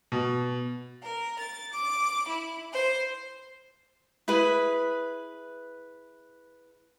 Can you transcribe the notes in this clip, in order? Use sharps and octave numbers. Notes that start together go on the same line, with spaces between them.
B2
A#4
A6
D6
E4
C5
E4 G#4 B4